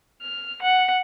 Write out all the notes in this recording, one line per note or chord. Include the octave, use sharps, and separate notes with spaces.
F6
F#5